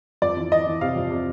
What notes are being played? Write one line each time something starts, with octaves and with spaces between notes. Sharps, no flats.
F2 D5
E3
E3 D#5
E3
C3 F5
F2
C3